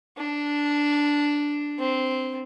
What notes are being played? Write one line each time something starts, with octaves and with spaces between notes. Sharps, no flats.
D4
C4